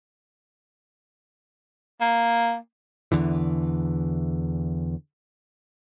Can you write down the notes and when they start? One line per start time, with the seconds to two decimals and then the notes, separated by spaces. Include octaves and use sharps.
2.01 A#3
3.12 E2 D3 E3